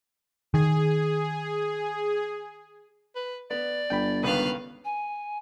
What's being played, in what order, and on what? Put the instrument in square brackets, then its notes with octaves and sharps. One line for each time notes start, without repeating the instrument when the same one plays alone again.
[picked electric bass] D#3 [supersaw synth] G#4
[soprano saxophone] B4
[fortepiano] B3 [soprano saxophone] D5
[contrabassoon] G1 [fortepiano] G5 B5
[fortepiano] C#2 D#3 B3 [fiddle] B4 F5
[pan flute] G#5